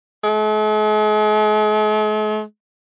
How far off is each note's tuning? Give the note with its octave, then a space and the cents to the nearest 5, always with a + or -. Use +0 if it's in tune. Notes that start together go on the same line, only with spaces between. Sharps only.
G#3 +45